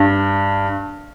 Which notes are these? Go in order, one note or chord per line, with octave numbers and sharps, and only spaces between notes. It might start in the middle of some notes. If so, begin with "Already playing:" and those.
Already playing: G2